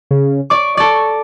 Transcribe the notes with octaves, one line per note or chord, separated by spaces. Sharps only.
C#3
D5 C#6 D6
A4 D5